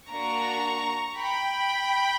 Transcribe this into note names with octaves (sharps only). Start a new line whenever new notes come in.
A#3 D4 F#4 A#5 C#6
G5 B5